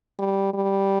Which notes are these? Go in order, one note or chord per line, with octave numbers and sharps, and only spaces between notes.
G3
G3